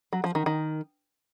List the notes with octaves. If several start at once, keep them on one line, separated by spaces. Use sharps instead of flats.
F#3
F3
D#3
D#3